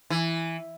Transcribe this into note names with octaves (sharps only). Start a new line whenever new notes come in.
E3